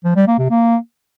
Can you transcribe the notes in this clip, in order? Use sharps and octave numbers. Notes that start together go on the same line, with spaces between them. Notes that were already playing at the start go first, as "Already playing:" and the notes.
F3
G3
A#3
C3
A#3